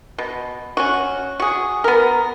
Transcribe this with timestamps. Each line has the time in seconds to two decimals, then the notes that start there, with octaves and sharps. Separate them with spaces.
0.18 B2
0.77 C#4 F#4
1.40 F#4 G#4
1.84 B3 A#4